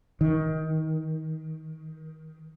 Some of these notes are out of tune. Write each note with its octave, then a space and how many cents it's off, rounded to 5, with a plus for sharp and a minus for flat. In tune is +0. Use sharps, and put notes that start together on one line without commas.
D#3 +20